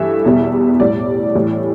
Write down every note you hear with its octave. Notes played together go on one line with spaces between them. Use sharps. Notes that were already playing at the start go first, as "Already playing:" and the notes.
Already playing: G2 E3 A3 E5
E2 B2 G3
A2 G3 D5
A2 E3 G3